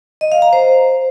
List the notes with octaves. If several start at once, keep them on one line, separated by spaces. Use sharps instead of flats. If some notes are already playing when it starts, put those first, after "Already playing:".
D#5
F5
A#5
C5